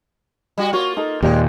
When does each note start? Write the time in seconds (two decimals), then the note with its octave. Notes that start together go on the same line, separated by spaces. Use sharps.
0.58 G3 F#4
0.73 A#3 F4 F#4 C#5
0.97 D#4 A4
1.22 D#2 A#2 G#3 G4 D5